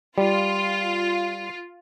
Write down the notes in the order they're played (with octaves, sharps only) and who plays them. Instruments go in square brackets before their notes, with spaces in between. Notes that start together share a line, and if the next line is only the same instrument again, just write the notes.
[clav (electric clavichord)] G3 [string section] F4